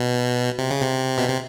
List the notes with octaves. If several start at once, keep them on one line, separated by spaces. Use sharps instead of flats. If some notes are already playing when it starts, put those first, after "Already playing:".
Already playing: B2
C3
C#3
C3
B2
C3